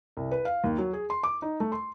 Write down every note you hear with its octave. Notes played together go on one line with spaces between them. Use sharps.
C2
B4
F5
D#2
F#3
G#4
C6
D6
D#4
A3
C6